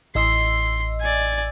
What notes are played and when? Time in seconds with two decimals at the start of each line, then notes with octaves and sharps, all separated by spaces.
0.15 A1 D#5 C6 E6
1.01 D5 G#5